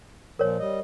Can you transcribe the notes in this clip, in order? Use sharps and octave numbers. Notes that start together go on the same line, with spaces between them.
A#2 F3 A#4 C#5
G3 D#5